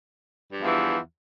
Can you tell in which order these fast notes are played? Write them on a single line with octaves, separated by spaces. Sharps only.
G2 F3 E2 E3